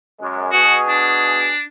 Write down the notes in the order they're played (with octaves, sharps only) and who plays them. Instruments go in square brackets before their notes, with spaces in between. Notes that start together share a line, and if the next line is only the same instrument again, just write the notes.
[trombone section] F#2 G#3
[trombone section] B2 G#4 [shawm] F#4
[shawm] D4